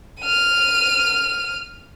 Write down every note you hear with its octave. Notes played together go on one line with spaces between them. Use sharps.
F6 D#7